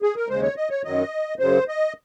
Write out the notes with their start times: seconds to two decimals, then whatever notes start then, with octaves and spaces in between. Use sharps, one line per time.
0.02 G#4
0.16 A#4
0.28 D#2 C#3 G#3 C5
0.42 C#5
0.57 D#5
0.70 C#5
0.84 F#2 D#3 F#3 D#5
1.39 F#2 C#3 F#3 C5
1.68 D#5